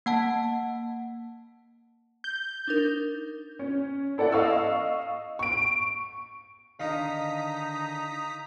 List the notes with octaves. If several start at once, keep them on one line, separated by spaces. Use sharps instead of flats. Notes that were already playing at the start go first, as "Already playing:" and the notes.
A#3 F#5 A5
G6
D4 D#4 A#4
C#4
E4 A4 D5 F#5
D#5 F5 C#6 E6
C#6 D7
D3 D#3 D#4 D#5 F5 A#5 D#6 B6